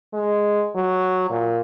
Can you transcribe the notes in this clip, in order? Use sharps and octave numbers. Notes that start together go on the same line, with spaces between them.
G#3
F#3
A#2